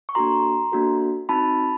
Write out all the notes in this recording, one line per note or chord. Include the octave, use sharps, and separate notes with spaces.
C#6
A#3 D4 F#4 A4 A#5 C6
A#3 D4 F#4 A4
C4 D#4 F#4 A5 B5